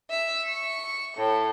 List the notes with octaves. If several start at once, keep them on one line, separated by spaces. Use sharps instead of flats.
E5
C#6
A2